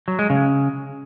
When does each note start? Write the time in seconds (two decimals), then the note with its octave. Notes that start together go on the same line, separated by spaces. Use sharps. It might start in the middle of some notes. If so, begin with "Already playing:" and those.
0.08 F#3
0.19 G#3
0.30 C#3